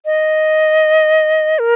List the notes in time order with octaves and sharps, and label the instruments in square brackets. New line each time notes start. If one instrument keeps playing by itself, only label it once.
[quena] D#5
A#4